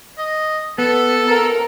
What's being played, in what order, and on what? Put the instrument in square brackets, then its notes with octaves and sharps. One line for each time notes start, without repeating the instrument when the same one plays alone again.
[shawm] D#5
[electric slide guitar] B3 [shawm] A4
[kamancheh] A#4